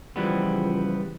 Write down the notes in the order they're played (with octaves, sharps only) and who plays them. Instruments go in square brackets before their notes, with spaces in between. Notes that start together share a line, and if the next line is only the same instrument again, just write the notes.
[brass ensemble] C#2 F3 [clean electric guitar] E3 G3 B3